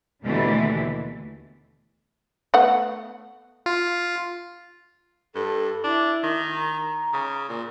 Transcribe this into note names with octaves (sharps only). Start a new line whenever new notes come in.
D#2 B2 D3 E3 A3 D4
A3 B3 F#5
F4
G2 A4
D4 E4
D#3
A#5
C#3
A#2